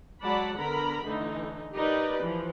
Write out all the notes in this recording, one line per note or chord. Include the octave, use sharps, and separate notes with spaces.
F#3 G#3 D5 F#5 A5 B5
D3 B3 A#4 A#5 B5
D3 E3 A3 D#4
D#4 G4 A#4 B4 D5
E3 F3